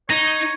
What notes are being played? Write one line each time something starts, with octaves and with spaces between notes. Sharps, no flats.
D#4 C#5